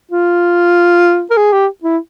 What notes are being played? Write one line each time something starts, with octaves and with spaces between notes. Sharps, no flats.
F4
A#4
G#4
G4
E4